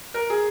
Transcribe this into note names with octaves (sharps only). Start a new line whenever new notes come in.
A#4
G#4